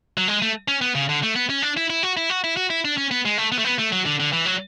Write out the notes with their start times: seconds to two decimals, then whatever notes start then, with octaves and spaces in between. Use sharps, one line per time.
0.18 F#3
0.28 G#3
0.42 A3
0.68 C#4
0.81 B3
0.95 C#3
1.09 D3
1.23 A3
1.36 B3
1.50 C#4
1.62 D4
1.77 E4
1.90 E4
2.03 F#4
2.17 E4
2.30 F#4
2.44 E4
2.57 F#4
2.70 E4
2.85 D4
2.97 C#4
3.11 B3
3.25 G#3
3.38 A3
3.52 B3
3.59 A3
3.65 B3
3.79 A3
3.92 F#3
4.06 D3
4.20 D3
4.33 E3
4.46 F#3